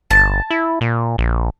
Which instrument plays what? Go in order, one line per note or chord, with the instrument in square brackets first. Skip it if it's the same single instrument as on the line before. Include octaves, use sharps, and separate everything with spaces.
[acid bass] G1 [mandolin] A5
[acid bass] E4
A#2
A#1